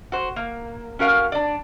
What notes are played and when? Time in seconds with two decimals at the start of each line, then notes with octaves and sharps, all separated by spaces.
0.12 F#4 C5
0.36 A#3
0.99 C#4 F#4 A#4 F5
1.32 D4 D5